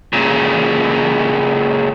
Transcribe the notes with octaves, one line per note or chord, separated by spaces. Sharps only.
A#2 C#3